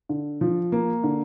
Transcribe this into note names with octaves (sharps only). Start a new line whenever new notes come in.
D3
F3
A#3
D3